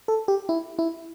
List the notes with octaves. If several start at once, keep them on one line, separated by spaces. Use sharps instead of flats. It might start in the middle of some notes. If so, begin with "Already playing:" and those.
A4
G4
E4
E4